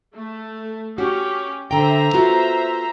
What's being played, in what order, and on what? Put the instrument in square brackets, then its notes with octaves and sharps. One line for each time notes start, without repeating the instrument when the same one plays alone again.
[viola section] A3
[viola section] C#4 G4 [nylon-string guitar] F#4
[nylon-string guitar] D3 G5 [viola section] C5 E5 A#5
[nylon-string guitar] B3 F4 F#4